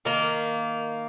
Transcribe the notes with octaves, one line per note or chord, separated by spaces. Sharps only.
D#3 A#3